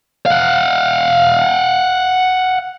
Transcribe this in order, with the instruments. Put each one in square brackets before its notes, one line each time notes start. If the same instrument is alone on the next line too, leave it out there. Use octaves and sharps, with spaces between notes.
[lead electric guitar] F5 F#5